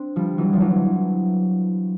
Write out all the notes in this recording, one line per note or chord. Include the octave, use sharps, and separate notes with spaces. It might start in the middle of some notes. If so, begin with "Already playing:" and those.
Already playing: C4 D4
F3 G3
E3 F#3
F3
E3 F#3